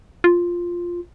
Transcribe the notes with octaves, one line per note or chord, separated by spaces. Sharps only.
F4